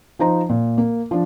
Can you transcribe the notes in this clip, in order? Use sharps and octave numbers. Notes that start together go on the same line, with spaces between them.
F3 D#4 C5 A#5
A#2
A#3
F3 D4